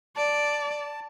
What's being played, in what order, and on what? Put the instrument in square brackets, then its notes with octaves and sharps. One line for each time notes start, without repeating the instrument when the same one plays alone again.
[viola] D5 [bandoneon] A5